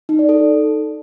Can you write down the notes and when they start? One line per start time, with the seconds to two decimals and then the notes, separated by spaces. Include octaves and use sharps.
0.09 D#4
0.19 D5
0.29 A4